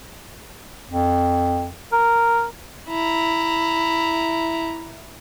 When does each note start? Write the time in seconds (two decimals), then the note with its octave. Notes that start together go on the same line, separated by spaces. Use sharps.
0.91 F2
1.92 A#4
2.89 E4 A#5